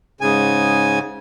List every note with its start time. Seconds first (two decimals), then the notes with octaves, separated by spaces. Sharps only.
0.21 G#2 C#3 G#5